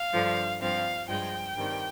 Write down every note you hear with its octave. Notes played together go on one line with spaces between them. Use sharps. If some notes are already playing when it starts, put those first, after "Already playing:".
Already playing: F5
G2 D3 F3
G2 F3 C4 F5
G2 F3 G#3 G5
G2 D#3 G3 C4